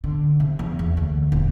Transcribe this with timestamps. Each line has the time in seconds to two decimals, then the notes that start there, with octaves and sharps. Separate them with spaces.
0.04 D3
0.40 C3
0.59 E2
0.79 E2
0.97 D2
1.32 D#1